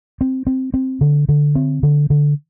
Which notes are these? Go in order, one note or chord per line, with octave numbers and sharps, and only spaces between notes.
C4
C4
C4
D3
D3
C4
D3
D3